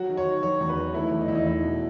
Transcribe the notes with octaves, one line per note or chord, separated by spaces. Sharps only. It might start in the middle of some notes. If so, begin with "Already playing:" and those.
Already playing: F#3 F#4
D#3
C#5
D#3
F#3 C#5
E2
B4
D#3
A3 E4
E2
D#4
E2 E4
D#4
E2 E4
B2